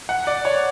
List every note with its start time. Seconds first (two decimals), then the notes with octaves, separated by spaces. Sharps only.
0.09 F#5
0.27 D5
0.45 C#5